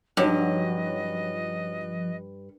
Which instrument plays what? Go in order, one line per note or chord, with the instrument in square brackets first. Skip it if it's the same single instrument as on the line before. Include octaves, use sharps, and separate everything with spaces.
[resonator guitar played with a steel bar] G2 [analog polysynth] F3 [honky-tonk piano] F#3 C#4 D#4 [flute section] D#5 F#6